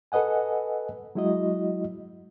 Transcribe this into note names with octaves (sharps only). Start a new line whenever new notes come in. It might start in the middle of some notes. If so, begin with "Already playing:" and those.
A4 B4 D#5 F#5 G#5
F#3 G#3 E4 F#4 D#5